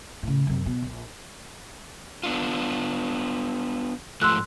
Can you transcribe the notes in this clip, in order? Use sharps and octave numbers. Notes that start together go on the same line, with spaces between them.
A2 C#3
F#2 C3
B2
A#1
B3 D4 F4
G#2 F3 A3 C6 E6 F#6